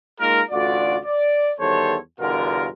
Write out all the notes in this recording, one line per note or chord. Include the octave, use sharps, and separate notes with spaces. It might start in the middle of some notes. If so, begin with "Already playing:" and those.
G#3 A#3 D#4 F4 A#4
A1 D2 F4 F#4 D5
D5
E2 D#3 G3 A4 C5 C#5
G1 E2 B2 D3 F4 A#4